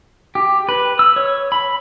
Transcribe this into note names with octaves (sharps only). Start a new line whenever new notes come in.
G4
B4
E6
C#5
B5